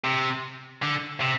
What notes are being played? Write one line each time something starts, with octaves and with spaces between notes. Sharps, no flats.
C3
D3
C3